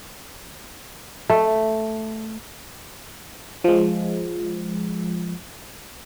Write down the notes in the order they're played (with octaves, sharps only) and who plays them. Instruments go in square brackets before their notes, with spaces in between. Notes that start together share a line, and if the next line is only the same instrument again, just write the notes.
[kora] A3
[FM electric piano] F3 G#3